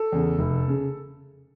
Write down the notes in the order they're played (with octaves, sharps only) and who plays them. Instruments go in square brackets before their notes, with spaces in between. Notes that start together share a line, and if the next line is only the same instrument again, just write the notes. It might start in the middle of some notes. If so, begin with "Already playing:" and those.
Already playing: [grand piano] A4
E2 C#3
F1
C#3